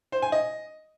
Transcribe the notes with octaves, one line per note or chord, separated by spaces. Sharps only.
C5
G#5
D#5